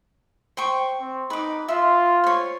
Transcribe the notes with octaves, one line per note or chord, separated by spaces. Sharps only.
C5 G5 C#6
C4
D#4 B4 D6
F4 E5 C6
C5 C#5